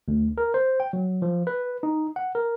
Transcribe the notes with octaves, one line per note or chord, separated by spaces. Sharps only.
D2
A#4
C5
G5
F#3
F3
B4
D#4
F#5
A#4